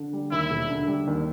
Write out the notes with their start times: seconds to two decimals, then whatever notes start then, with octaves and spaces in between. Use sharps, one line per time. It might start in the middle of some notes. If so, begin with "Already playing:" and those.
Already playing: D3
0.13 G3
0.32 D#2 E4
0.50 E1
0.70 D3
0.88 G3
1.07 D#2